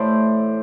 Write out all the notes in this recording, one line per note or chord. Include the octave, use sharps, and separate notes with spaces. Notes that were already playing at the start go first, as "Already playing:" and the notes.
Already playing: A2 E3 A3 C5 D5